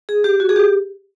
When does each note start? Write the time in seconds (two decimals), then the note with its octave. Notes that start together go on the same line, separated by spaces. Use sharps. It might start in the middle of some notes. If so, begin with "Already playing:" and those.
0.09 G#4
0.24 G4
0.40 F#4
0.49 G#4
0.56 G4